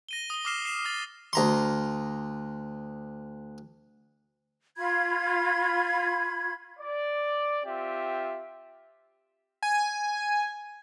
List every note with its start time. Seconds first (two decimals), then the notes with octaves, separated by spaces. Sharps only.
0.09 A#6 D#7 G7
0.30 D#6 G7
0.45 D6 D#6 F6 C7 E7 G7
0.65 C7 E7
0.85 D#6 A6
1.33 D2 A#5 C6
4.77 F4 B5 G#6
6.80 D5
7.65 C4 F4 G4 E5
9.63 G#5